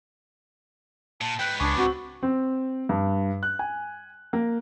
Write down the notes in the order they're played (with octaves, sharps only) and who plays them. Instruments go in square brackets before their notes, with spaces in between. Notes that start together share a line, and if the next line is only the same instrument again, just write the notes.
[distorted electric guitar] A#2 [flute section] A5
[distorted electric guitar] G#2 B3 [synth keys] G5 [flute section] F#6
[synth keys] C#2 G#4 C#5 [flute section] D4 B5 D6
[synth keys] C4 [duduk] F#4
[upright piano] C4
G2
F#6
G#5
A#3